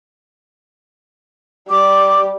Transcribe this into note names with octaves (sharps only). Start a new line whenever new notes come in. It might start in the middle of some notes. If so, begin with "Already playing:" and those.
G3 D6